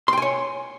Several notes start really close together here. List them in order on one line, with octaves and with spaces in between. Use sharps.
C6 G5 G#5 C#5